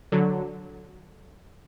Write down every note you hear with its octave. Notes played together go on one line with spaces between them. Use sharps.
D3 F#3